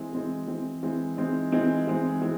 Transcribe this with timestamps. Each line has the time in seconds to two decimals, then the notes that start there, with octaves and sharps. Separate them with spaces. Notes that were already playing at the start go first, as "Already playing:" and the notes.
Already playing: E3 G#3 C4
0.13 E3 G#3 C4
0.48 E3 G#3 C4
0.82 E3 G#3 C4
1.17 E3 G#3 C4 D#4
1.52 E3 G#3 C4 D#4
1.87 E3 G#3 C4 D#4
2.22 E3 G#3 C4